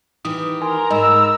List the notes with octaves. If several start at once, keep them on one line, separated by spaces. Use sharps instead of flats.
D#3 E3 G4 D#6
A#4 G#5 A#5 C6
G#2 D#5 B5 E6